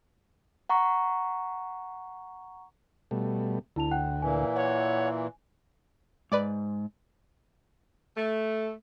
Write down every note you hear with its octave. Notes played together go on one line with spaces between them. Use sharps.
F#5 A#5 C#6
B2 G3 A3
D2 E4 A5 F7
F#5 G5 F#6
A#2 E3 G#5
C#5 F#5
G#2 B4 D5 D6
A3